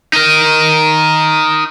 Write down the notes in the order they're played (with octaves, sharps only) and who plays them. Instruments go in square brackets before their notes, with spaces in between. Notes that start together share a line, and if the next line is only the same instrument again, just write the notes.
[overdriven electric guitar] D#4 A#4